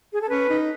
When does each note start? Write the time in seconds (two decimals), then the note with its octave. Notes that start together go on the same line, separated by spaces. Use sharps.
0.13 G#4
0.21 A4
0.29 C#4 B4
0.50 D#4